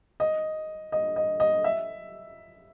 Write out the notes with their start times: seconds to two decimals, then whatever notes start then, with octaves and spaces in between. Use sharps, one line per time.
0.20 D#5
0.92 D#5
1.16 D#5
1.40 D#5
1.64 E5